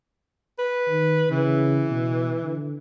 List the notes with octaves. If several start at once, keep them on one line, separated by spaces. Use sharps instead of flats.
B4
D#3
C#3 E3
B2
D3